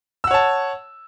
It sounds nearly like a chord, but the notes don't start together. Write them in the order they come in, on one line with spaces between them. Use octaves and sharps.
E6 F#5 C#5 A5